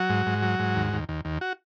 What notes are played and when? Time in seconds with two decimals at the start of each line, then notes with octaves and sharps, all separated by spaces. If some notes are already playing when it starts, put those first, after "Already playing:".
Already playing: F#3 F#4
0.09 G#2
0.26 G#2
0.42 F#3
0.59 G#2
0.76 D#2
0.93 D#2
1.09 D#2
1.25 D#2
1.41 F#4